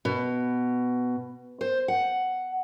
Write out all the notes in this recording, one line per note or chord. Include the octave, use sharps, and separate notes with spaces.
B2
C5
F#5